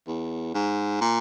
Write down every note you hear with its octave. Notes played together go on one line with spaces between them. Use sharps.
E2
G#2
A#2